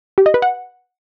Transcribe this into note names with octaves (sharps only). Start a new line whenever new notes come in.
G4
D#5
B4
F#5